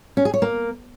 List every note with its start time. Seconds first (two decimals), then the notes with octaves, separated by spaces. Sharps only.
0.17 C#4
0.25 G#4
0.34 C#5
0.42 A#3